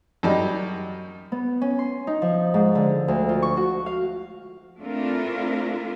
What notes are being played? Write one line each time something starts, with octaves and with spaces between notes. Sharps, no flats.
F#2 G3 D#4
B3
C#4
C6
D#4
F3
G#2
D3
D2
F4
C#6
F#4
F5
A3 C4 D4 E4 F4 A#4